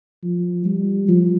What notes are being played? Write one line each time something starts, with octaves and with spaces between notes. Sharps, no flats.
F3
G3
F3